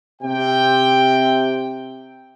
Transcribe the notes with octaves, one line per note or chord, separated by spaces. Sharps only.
C3 G5